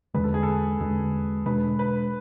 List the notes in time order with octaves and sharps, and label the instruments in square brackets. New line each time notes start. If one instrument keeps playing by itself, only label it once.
[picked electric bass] E2 D3 G#3 [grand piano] B4
[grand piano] A4
G#4
A4
[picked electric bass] E2 D3 G#3
[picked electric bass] B2 G#3 D4 [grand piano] B4
[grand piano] B4